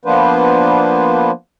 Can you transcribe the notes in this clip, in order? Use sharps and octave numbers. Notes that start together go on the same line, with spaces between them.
F3 A#3 B3 D4 B4 C5